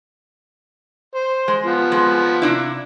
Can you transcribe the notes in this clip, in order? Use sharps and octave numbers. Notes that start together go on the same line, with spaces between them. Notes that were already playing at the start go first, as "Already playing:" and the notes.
C5
G#3
F3 B3
G#3
C3 D4 E4